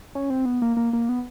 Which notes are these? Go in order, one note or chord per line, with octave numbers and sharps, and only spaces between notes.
C#4
C4
B3
A#3
A#3
A#3
B3